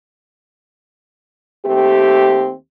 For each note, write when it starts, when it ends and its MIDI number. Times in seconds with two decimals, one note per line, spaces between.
1.66 2.54 39
1.66 2.54 57
1.66 2.54 60
1.66 2.54 67